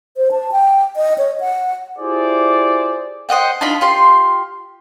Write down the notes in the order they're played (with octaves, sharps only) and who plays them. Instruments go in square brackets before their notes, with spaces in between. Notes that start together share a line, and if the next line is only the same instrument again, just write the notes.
[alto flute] C5
A5
G5
D#5
C#5
F#5
[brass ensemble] E4 F4 G4 G#4 C5 D5
[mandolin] C5 D#5 F#5 G5
D4 D#4 F4 B5
F4 G4 C6